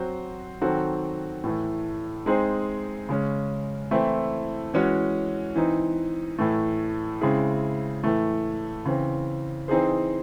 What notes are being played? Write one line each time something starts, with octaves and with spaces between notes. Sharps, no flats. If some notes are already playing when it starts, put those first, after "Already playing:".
Already playing: F#3 C4 F#4 C5
D#3 F#3 C4 F#4 A4
A2 E3 A3
G#3 C4 D#4 G#4 C5
C#3 G#3 C#4
E3 A3 C4 E4
E3 G#3 C#4 F#4 C#5
E3 C4 D#4
A2 E3 A3
C#3 G#3 C4 E4 G#4
A2 E3 A3
C#3 E3 C4
E3 C4 D#4 G#4 C5